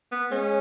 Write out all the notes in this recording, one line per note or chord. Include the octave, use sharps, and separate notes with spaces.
B3
G#3 C#4